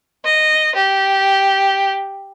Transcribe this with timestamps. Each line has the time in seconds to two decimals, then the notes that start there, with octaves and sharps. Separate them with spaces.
0.25 D#5
0.76 G4